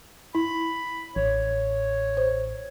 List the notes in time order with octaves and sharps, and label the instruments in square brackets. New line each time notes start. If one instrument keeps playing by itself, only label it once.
[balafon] E4 [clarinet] B5
[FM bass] A1 [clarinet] C#5
[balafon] C5